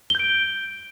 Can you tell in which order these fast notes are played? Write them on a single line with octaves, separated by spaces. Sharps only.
G7 G6 D7